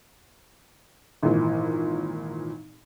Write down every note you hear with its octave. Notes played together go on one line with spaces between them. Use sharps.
G#1 A#2 E3